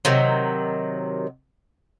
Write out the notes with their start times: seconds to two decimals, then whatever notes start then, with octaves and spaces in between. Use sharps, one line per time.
0.05 C3 D#3 F#3